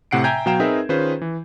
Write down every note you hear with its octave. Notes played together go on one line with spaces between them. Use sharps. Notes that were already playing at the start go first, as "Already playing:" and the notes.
A2 C3 F#5 C7 D7
E5 G5 G#5 A#5 G6 G#6
B2 F#3 F5 G5 A#5 E7
C4 D#4 G#4 A#4 B4 E5
D#3 C#4 F4 G#4 B4 C5
E3